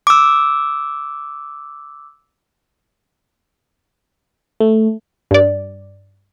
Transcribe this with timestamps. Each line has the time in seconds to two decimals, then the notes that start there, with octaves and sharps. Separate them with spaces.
0.07 D6 E6
4.60 A3
5.31 G2 D5